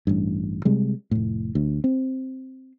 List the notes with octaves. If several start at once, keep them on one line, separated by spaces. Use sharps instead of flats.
A1 G2
C3 G3 G#3
F1 A2
D2
C4